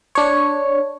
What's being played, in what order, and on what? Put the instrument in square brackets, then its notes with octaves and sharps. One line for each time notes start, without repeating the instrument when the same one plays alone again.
[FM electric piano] D4 C#5